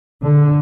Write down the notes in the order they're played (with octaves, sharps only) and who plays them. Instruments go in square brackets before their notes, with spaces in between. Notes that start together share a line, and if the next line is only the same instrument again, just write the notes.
[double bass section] D3